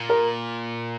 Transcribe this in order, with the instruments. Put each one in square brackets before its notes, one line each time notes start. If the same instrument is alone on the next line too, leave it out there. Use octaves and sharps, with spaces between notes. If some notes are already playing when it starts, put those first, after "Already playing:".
Already playing: [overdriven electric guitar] A#2
[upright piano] A#4